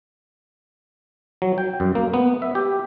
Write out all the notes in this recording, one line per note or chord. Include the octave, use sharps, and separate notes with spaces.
F#3
G5
F#2
A#3
B3
E5
G4